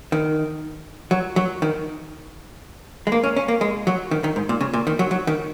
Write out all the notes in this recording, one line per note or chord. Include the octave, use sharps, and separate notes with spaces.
D#3
F#3
F#3
D#3
G#3
A#3
C#4
C#4
A#3
G#3
F#3
D#3
D#3
G#2
A#2
C#3
A#2
D#3
F#3
F#3
D#3